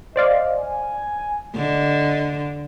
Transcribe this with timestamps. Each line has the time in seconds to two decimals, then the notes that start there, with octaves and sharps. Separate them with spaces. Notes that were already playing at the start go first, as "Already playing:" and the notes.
0.16 C5 D5 D#5 F5
0.58 G#5
1.56 D3 D#5